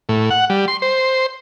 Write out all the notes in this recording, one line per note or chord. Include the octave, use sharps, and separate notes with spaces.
A2
F#5
G3
C6
C5